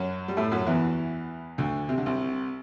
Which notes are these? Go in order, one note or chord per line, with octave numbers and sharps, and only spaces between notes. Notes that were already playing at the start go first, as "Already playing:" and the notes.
Already playing: F#2 F#3
G3
A2 A3
F#2 F#3
E2 E3
D2 D3
C3
D3
C2 C3